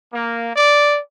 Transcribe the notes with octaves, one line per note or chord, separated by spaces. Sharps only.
A#3
D5